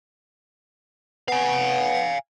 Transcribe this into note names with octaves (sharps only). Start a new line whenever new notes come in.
B3 F5 G#5